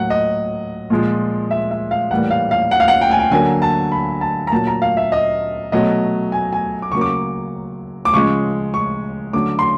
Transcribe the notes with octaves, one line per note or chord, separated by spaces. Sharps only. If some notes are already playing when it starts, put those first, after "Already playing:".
Already playing: A2 F#3 A#3 F#5
D#5
A#2 F3 G#3
E5
E5
F5
A2 E3 G3 A#3 F#5
F5
F5
F#5
F5
F#5
G5
G#5
G5
D3 F#3 A#3 G#5
A5
B5
A5
A#5
A#2 F#3 A#3 A5
A#5
F5
E5
D#5
B2 F#3 A3 D#5
G#5
G#5
D6
C#3 F#3 A#3 C#6
D6
D6
C#3 F3 G#3 C#6
C#6
D3 F#3 A3 D6
C6